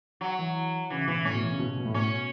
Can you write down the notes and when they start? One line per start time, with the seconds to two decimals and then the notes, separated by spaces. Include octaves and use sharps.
0.21 F#3
0.39 E3
0.90 C#3 E3
1.07 B2 E3
1.24 A2 C#4
1.34 B2
1.42 E3
1.50 C#3
1.59 B2
1.77 B2
1.86 A2
1.94 B2 C#4